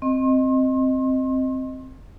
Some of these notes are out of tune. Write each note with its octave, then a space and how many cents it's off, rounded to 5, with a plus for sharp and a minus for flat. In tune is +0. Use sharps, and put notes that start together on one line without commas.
C4 +0 D#5 +0 C6 +35